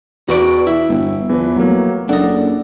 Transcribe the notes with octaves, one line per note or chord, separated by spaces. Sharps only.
E2 F#4 B4 D5 C#6 D7
E4 E6
G1
E2 E3 F3 B4
F#3 A3 A#3
F#1 D4 A4 D#5 F#5